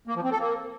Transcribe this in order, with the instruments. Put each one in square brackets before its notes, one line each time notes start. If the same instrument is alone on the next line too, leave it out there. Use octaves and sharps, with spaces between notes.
[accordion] A#3
F3
C4
A4
A#3